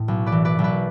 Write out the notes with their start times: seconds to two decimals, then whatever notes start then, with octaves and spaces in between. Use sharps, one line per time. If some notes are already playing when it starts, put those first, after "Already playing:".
Already playing: A2 E3
0.08 B1
0.26 B4 D5
0.32 E3
0.45 B4 D5
0.59 B1
0.64 B4 D5